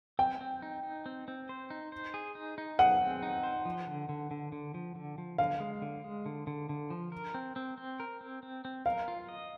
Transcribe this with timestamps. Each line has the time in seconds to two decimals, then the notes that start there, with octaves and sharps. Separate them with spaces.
0.19 C4 G5
0.41 C4
0.62 D#4
0.83 D#4
1.06 C4
1.28 C4
1.49 C5
1.70 D#4
1.92 C5
2.14 G#4
2.35 D#4
2.58 D#4
2.79 G#4 F#5
3.01 C4
3.23 D#4
3.43 C5
3.65 F3
3.87 D3
4.09 D3
4.31 D3
4.52 D3
4.74 F3
4.95 D3
5.18 F3
5.38 D3 F5
5.60 G#3
5.82 D3
6.04 G#3
6.26 D3
6.47 D3
6.69 D3
6.90 F3
7.12 A#4
7.34 C4
7.56 C4
7.78 C4
8.00 A#4
8.21 C4
8.43 C4
8.65 C4
8.86 A#4 F5
9.08 F4
9.29 D#5